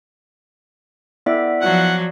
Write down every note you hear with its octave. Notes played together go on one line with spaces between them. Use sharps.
B3 E4 D5 E5 G5
F3 F#3 F#5